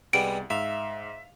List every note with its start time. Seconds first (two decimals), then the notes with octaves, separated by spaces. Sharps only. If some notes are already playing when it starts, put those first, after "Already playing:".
0.13 C2 G3 G#3 B3 D5 D7
0.50 G#2 E5 F5